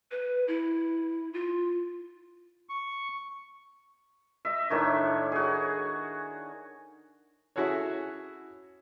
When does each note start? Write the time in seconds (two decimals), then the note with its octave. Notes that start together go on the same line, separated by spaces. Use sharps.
0.11 B4
0.48 E4
1.33 F4
2.69 C#6
4.45 D#5 E5
4.70 A2 D#3 D4 C#5
5.32 F#4 G#4
7.56 C#4 E4 F#4 G#4 A4 C#5